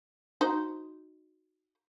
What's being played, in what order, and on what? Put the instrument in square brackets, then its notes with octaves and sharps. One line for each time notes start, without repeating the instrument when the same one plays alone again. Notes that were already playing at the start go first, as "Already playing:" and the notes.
[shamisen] D#4 F#4 C5